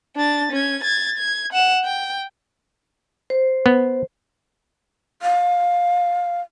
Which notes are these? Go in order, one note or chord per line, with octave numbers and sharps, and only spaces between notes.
D4 A6
C#4 G#6
G#6 A6
G#6
F#5 E7
G5
C5
B3
F5